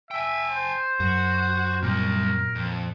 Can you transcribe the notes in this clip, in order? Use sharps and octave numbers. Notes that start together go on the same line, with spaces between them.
E5 G5 G#5
C5
F#2 F#4
A#2 G3 C4 A#4
F2